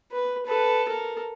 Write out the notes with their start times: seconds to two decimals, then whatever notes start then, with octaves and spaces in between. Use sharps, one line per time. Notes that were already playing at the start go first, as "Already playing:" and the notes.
0.12 B4
0.46 A4 B4
0.89 A4 A#4